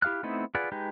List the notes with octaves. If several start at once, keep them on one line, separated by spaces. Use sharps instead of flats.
E4 G4 F5 F6 F#6
A3 B3 C4 D#4 E4
F4 G#4 B4 D5 F#5
G#3 D#4 G4 B4